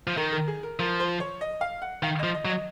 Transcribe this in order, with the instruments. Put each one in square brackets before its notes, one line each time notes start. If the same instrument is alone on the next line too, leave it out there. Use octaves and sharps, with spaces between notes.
[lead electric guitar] F3
[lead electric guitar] D#3 [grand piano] A#4
[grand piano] A#4
G#4
A#4
[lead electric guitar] F3 [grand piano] A#4
[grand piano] C5
C#5
D#5
F5
F#5
[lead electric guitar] D#3 [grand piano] F5
[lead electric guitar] F3 [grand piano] D#5
[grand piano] D#5
[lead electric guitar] F#3
[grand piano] D#5